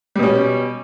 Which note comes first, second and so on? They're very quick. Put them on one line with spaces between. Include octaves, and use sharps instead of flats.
G3 B2 C#4